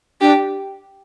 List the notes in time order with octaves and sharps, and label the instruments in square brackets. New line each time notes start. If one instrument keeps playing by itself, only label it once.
[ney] D4 [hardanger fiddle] G4